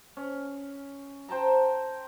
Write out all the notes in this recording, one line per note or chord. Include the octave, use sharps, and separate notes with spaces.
C#4
C5 G5 A5 A#5